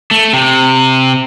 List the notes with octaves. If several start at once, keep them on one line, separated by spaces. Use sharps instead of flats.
A3
C3